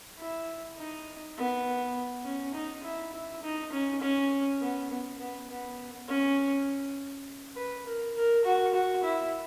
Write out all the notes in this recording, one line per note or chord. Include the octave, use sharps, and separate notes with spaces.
E4
D#4
B3
C#4
D#4
E4
E4
D#4
C#4
C#4
B3
B3
B3
B3
C#4
B4
A#4
A#4
F#4
F#4
E4